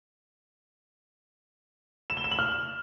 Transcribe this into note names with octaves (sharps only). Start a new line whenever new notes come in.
E7
G7
E7
F#7
F6